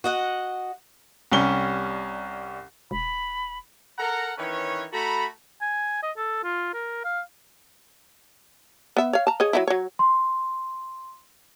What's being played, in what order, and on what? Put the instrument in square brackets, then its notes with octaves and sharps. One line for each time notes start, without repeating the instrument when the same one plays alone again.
[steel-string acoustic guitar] F#4 D#5 F#5
[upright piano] C2 G3 C#4 G7
[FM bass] E1 [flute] B5
[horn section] A4 A#4 F#5 A#5
D#3 E3 C#4 B4 C#5
A3 F#4 A4 A#5 B5
[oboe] G#5
D#5
A4
F4
A#4
F5
[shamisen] B3 E5
C#5 F5
A5 A#5
G#4 C#5 D#5
F#3 D#4 E4
F#3 C#5
[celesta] C6